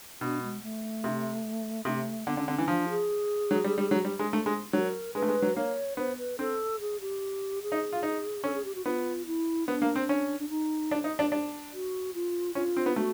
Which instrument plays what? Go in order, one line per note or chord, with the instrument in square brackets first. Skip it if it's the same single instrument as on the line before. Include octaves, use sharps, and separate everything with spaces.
[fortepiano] B2 [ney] D4
[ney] G#3
A3
[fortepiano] C3
[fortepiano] C3 [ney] A3
[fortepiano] D3 [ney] B3
[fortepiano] D3 [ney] C#4
[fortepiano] D3 [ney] C4
[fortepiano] E3 [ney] C#4
[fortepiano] F3 [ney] D4
[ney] G#4
[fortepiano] F#3
G3
G3
F#3
G3
G#3
A3
G#3
[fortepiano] F#3 [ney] A#4
[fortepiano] G#3 [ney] B4
[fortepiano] A3
G#3
F#3
[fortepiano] A#3 [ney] C#5
[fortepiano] B3 [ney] C5
[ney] B4
[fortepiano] C4 [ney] A4
[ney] G#4
G4
G#4
[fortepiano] D#4
F4
D#4
[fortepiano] C#4 [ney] A4
[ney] G#4
G4
F#4
[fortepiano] B3 [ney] F4
[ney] E4
[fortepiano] B3 [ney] D4
[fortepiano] A#3
C4
C#4
[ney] D4
D#4
[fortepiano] D4
D#4
D4
D4
[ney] F#4
F4
[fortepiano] C#4 [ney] F4
[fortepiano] C4
B3
[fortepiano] A3 [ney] F#4